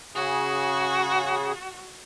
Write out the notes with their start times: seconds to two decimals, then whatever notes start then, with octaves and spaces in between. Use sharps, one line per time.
0.15 C#3 F#4 G#4